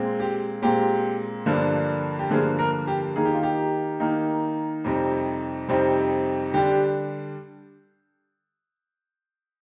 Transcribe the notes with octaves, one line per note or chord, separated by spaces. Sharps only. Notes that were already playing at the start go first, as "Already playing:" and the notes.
Already playing: A#2 G#3 C4
G4
A#2 G#3 C4 G4
G2 D3 F3 A#3 D4
G4
G2 D3 F3 A#3 D4 G#4
A#4
G4
D#3 A#3 D#4 G#4
G4
F4
G4
D#3 A#3 D#4
F2 C3 G3 C4 D#4
F2 C3 G3 C4 D#4
D3 G3 D4 G4